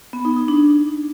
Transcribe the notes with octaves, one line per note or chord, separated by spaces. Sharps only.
B3
D#4
D#4
D4